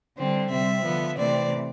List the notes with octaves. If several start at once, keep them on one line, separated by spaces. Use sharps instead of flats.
D3 G3 C4
C3 G3 C4 E5
D3 F3 B3
C3 E3 A3 C4 D5